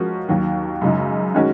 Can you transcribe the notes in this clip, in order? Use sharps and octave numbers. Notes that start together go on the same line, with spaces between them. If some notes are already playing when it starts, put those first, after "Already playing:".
Already playing: F3 G#3 C#4 F#4 A#4
D#2 D#3 F#3
F#2 C#3 G#3 D#4
D#3 G#3 C#4 F#4